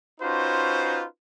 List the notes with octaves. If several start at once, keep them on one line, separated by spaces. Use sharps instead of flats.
C#4 D#4 F4 F#4 B4 C5